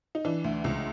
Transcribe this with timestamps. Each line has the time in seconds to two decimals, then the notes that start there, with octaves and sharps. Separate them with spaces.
0.15 D#4
0.25 E3 D4
0.44 D2
0.64 C#2